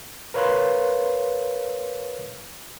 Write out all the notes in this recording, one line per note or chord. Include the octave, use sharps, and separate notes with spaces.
A#4 B4 C#5 F5 C6 F#6